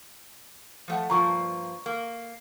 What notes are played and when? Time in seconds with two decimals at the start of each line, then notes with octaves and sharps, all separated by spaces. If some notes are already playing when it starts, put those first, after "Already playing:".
0.88 F3 A3 F#5
1.10 G2 F3 A#3 A#5 C#6
1.86 A#3